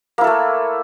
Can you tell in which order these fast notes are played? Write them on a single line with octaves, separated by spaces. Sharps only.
A#3 E4 A4 A3